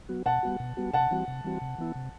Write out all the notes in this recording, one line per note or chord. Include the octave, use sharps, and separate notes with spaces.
F#3 B3 F#4
B2 F#5 A5
G3 B3 F#4
B2
G3 B3 F#4
C3 F#5 A5
E3 G3 C4 F#4
C3
E3 G3 C4 F#4
C3
E3 B3 E4
C3